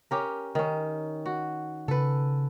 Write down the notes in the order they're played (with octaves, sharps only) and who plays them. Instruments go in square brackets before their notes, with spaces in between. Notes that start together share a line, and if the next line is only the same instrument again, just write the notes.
[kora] C#4 G4 A#4
D#3 C#4
F#4
[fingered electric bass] C#3 [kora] A4 B4